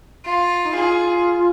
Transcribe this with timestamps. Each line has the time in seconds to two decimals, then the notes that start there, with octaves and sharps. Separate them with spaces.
0.25 F4
0.65 D#4
0.74 F4 G#4